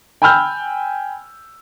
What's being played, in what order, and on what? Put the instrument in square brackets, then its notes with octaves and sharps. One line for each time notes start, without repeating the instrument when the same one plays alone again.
[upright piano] G5 G#5 B5 E6 F6 G6